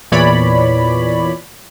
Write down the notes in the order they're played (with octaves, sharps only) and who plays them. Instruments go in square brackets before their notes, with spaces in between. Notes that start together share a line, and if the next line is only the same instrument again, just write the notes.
[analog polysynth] E2 A#2 E3 C#5 D5 B5